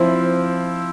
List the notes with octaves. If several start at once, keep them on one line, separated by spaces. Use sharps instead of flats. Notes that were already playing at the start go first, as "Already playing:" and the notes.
Already playing: F3 C4 E4